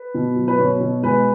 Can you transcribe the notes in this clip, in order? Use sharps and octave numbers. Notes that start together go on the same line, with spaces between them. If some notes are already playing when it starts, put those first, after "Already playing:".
Already playing: B4
B2
F#3
B4
B2 C#5
B2
G#3 B4